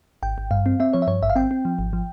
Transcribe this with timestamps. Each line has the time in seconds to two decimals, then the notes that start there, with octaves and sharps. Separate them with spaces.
0.22 G#1 G5
0.38 G#1
0.51 G2 F5
0.66 C4
0.80 C4 E5
0.93 F3 C#5
1.02 E5
1.07 G2 C#5
1.22 G#1 E5
1.30 F5
1.36 C4 G5
1.51 C4
1.65 F3
1.79 G#1
1.93 F3